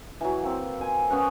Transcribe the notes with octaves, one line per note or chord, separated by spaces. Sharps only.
E3 F#3
A#3 C4
G#5
B3 C#4 F#5 G5